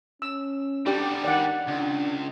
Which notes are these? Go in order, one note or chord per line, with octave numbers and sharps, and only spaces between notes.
C#4 E6
G3 B3 D4 G4 D5
D#3 D5 F#5
C#2 D4